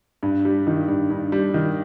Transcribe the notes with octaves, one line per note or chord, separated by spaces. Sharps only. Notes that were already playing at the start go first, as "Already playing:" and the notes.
G2
G3
D#3
G2
G2
G3
D#3